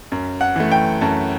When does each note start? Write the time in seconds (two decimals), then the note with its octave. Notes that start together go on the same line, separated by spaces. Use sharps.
0.12 F#2
0.41 F#5
0.56 E3 A3
0.71 G5
1.01 F#2 A5